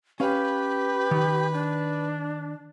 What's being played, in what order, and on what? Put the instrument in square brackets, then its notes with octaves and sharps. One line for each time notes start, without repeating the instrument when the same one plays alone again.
[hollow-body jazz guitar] C#4 F5 [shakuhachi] G4 [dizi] B4
[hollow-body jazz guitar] D#3
[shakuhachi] D4